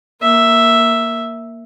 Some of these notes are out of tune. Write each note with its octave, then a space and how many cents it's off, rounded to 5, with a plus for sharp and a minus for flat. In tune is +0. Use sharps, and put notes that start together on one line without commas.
A#3 +0 E5 +0